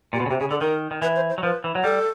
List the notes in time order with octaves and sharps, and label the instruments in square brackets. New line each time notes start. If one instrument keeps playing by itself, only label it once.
[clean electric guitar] A#2 [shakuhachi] G4
[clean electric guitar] B2 [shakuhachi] F#4
[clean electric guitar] C#3
[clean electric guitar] C3 [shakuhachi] G4
[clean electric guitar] C#3 [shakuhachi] G#4
[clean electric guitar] D3 [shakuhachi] A4
[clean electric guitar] D#3 [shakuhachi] A#4
[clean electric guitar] D#3
[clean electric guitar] E3 [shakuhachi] B4
[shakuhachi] C5
C5
[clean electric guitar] F#3
[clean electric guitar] F3 [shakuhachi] B4
[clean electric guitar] E3
F#3
[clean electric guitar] G3 [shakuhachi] A4